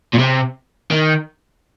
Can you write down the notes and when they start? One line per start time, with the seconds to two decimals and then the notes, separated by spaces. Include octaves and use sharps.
0.14 A#2
0.19 C3
0.91 D#3